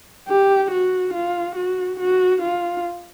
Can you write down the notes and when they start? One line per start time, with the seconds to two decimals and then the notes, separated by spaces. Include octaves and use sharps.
0.28 G4
0.71 F#4
1.14 F4
1.56 F#4
2.00 F#4
2.42 F4